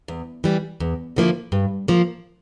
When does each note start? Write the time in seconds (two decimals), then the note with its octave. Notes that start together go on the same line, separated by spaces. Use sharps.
0.08 E2
0.44 E3 G3
0.80 E2
1.16 D3 F3 A#3 E4
1.52 G2
1.88 F3 A#3